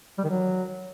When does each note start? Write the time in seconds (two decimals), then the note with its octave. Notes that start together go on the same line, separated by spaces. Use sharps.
0.18 G3
0.24 D#3
0.30 F#3